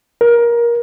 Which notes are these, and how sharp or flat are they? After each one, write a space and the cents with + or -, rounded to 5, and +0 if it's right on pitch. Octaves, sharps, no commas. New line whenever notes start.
A#4 +20